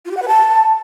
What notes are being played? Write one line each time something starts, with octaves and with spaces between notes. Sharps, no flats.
F4
G4
F#5
B4
A5